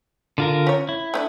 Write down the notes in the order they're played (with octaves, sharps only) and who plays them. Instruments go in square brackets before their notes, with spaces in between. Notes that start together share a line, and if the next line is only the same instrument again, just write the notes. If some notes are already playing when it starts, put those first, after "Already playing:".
[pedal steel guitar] D3 F4 A#4
[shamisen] C#4 C#5
[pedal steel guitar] E4
[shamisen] A3 C#4 D4